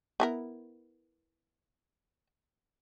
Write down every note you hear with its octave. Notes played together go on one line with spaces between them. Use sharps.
B3 E4 A#4